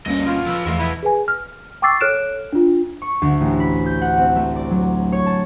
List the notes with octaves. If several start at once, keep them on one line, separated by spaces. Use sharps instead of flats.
D2 G2 G3 A#3 C#4 D#5
B2 F4
F3 A4 B4 E6
E2 E3 A3 E4 D#5 F5
B2 B3 E4
G#4 B4 G#5
F6
G5 C#6 D6 E6 A6 C7
A4 C#5 F6 F#6 D7 E7
D4 F4
C#6
D2
A1
B5
G6
F#5
C4
A3
D5
F#3
C#5
A5